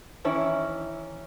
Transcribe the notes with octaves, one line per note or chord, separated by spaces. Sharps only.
D#3 E3 C#4 E4